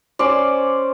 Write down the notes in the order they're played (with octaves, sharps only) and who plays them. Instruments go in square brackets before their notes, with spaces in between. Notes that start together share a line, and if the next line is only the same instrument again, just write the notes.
[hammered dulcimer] C#4 C5 D5